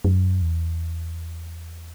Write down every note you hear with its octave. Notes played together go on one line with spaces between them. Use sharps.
F#2
E2